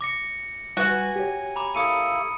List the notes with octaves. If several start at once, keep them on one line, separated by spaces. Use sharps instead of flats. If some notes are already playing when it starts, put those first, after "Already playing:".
D6 A#6 C#7
G3 F#4 B4 G#5
G4 C#5
A#5 B5 D6
A#3 E4 A4 D#6 C#7 D#7